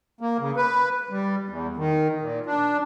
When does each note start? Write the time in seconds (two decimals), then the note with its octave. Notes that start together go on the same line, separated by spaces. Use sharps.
0.21 A#3
0.40 C#3
0.57 B4
1.10 G3
1.49 E2
1.77 D#3
2.21 A#2
2.46 D4